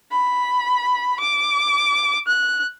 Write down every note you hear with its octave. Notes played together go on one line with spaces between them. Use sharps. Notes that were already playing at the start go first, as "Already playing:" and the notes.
B5
D6
F#6